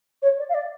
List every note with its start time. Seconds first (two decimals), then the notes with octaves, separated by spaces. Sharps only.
0.22 C#5
0.38 D5
0.49 F5
0.54 D5